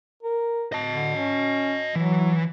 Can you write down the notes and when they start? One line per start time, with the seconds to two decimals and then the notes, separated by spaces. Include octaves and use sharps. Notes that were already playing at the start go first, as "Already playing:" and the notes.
0.23 A#4
0.72 D#5 A5
0.91 D3
1.15 C#4
1.96 E3 F#3